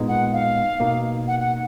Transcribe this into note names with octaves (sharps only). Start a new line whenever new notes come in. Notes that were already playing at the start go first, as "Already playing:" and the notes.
Already playing: A#2 G#3 B3 D#4
F#5
F5
B2 A#3 D#4
F#5
F#5